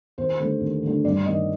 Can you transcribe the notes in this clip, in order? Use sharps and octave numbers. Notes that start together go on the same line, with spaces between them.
D#2 C5
D3 A3 D4
D#2
D3 A3 D4
G2 D5
D#3 A#3 D#5